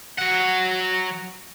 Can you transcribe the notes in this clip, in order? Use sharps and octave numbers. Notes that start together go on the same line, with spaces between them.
F#3 F#5